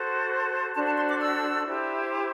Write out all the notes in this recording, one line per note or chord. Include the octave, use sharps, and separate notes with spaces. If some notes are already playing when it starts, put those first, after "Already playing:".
Already playing: F#4 A4 C5
D4 F#4 A4 C5 A5
A5
C6
D6
E6
E4 G4 C5